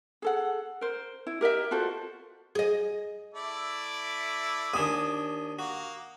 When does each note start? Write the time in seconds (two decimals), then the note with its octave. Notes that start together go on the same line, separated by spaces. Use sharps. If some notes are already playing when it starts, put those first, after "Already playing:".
0.22 G#4 A4 F#5
0.81 A#4 C5
1.27 E4
1.41 G4 A#4 D#5 E5
1.71 F4 F#4 A4 C5
2.55 G#4 D#5
3.34 A3 E4 D5
4.73 D#2 D4 G#5 D#6
5.59 A#3 F#4